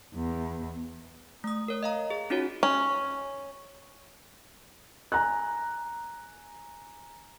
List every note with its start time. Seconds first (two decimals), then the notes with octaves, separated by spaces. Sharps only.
0.15 E2
1.44 A3 D#6
1.68 A#4 C#5
1.83 D#5 F5 A#5
2.10 G#4
2.30 C#4 D#4 F4 F#4 C#5
2.63 C#4
5.12 G#5 A#5 F#6